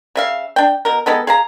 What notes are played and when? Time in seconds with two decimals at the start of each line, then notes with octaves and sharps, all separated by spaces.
0.15 C#3 E5 F5
0.56 D4 G5
0.85 B2 A#4
1.06 D#3 G#3 B3 A4
1.27 G#4 F5 A#5